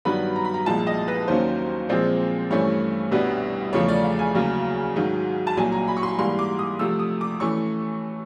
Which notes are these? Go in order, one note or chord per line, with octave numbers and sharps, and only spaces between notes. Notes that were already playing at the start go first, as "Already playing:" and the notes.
G2 D#3 F#3 B3 D4 B5
A#5
B5
A#5
C2 A#2 F3 G#3 A5
D#5
B4
D#2 D#3 F#3 A#3 C#4 C5
A#2 F3 G#3 C4
G2 E3 A3 C#4 C#5
C2 B2 G3 B3 D4
E2 C#3 F3 A3 C#5
D5
F5
G#5
D2 C#3 F#3 A#3
G#2 D#3 F#3
A5
C2 A#2 F#3 G#5
A#5
B5
C#6
C6
G#2 E3 G3 A#3 C6
D6
D#6
C3 F3 A3 E6
D#6
D6
E3 A3 C#4 C#6